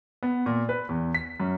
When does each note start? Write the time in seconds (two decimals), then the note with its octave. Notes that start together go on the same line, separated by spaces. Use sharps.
0.23 B3
0.46 A#2
0.69 B4
0.89 E2
1.14 B6
1.40 F#2